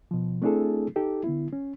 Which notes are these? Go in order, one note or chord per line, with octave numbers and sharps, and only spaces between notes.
B2 F3
A3 C4 D4 E4 G#4 A4
D#4 G4 A4
D3 B3 E4
C#4